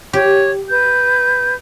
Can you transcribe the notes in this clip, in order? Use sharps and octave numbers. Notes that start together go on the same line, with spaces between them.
G4 C#5
B4 G6